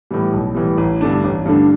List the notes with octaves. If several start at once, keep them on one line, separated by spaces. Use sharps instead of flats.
A2 E3 G3
B1
A2 E3 G3
A1
G2 D3 A3 D4
A1
G2 D3 A3 D4